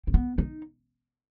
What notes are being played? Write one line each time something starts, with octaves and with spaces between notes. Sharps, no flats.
C4
B3
D#4